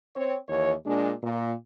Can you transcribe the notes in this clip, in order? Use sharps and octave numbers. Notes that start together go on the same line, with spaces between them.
C4 C#5
D#2 E3 C#5
A#2 G#3 D4
A#2